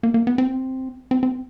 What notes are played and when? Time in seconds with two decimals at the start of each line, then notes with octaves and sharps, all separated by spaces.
0.03 A#3
0.14 A#3
0.27 B3
0.38 C4
1.11 C4
1.23 C4